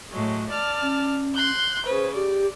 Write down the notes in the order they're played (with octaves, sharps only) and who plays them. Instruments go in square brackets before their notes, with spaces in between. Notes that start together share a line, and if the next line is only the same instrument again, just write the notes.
[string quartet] A2 F#3 G#3
D5 A5 F6
[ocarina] C#4
[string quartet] C6 F#6 G6
[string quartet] C#3 B4 [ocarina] C5
[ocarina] G4 [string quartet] D5